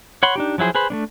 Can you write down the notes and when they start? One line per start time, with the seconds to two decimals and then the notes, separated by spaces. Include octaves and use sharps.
0.23 C#5 F#5 B5 C6
0.36 D4 D#4 G4
0.58 F3 F#3 E4 G#4 C5
0.75 G#4 B4 C5 B5
0.90 A3 B3 D4